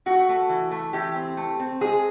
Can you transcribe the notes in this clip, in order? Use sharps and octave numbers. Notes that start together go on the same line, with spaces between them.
A3 F#4
A3
E3
A3
E3 G4
C4
A3
C4
G#3 G#4